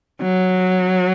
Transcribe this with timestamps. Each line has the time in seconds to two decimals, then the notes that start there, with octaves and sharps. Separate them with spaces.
0.22 F#3